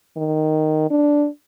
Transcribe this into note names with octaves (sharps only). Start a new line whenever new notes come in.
D#3
D4